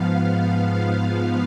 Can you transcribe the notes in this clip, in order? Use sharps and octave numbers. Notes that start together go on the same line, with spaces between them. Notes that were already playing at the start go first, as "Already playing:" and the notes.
Already playing: G#2 F3 B3 F5